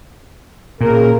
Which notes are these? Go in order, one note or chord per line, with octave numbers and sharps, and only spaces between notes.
A#2 C#3 A#4